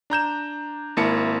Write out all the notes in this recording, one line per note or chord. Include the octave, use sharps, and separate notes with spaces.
D4 A#5 G6 E7
G#1 A#3 E4 A5 C#7